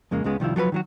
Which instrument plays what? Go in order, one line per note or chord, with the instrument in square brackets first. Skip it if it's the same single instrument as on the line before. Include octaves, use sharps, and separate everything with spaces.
[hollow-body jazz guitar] F2 C#3 G#3 A#3
C#2 C#3 G#3 B3
C2 D#3 F3 E4
F3 F#3 A4 B4
D#3 F#3 F#4